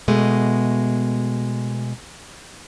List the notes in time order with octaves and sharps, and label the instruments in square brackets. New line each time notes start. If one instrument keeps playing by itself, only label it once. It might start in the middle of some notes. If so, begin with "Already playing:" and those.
[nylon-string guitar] B2 G#3 A3